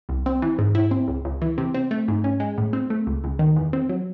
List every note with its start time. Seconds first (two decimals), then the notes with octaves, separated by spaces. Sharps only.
0.09 C2
0.26 C4
0.42 E3
0.59 G#2
0.75 E4
0.91 C4
1.08 C#2
1.25 C#2
1.42 E3
1.58 C3
1.74 C4
1.91 A3
2.08 G#2
2.24 C#4
2.40 G#3
2.58 A2
2.73 C4
2.90 A3
3.07 C#2
3.24 C#2
3.39 D#3
3.56 E2
3.73 C4
3.89 F#3